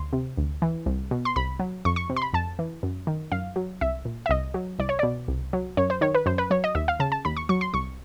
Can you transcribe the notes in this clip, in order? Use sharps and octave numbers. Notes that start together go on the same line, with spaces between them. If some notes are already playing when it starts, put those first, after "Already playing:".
Already playing: D2 C6
C3
D2
E3
C2
B2
C6
C2 B5
F#3
F2 C#6
C#6
C3
C6
B5
F2 A5
E3
F#2
D#3
F#2 F5
F#3
C2 E5
A#2
E5
C2 D#5
F#3
C2 D5
C#5
B2 D5
C2
F#3
F#2 C#5
C5
D#3 C#5
B4
F#2 C5
B4
F#3 C#5
D#5
D#2 E5
F5
C#3 A5
A5
D#2 B5
C#6
F#3 C#6
C6
C2 C#6